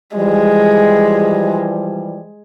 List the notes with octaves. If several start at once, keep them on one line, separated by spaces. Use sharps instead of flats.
E3 F3 G3 G#3